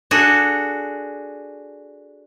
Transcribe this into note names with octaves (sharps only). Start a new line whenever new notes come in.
D4 F#4 G#4 A4